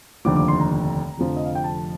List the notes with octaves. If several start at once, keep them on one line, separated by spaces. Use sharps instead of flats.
F1 D#2 D3 F3 D6
D6
C6
A#5
F1 F2 D3 F3
D#5
F5
G5
A5